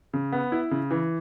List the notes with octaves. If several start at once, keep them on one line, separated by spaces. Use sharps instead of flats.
C#3
B3
E4
C#3
E3